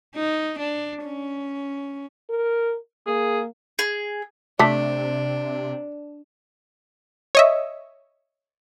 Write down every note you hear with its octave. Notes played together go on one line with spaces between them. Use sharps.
D#4
D4
C#4
A#4
A#3 G#4
G#4
C3 A3 D4 A5 D6 B6
C#5 D#5 E5